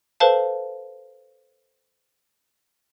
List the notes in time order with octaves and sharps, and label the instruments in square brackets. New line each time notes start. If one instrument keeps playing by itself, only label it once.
[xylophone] A4 B4 C5 F5 A5